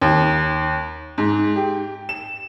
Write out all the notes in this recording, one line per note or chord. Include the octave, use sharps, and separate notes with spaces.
D#2
G#2
G4
E7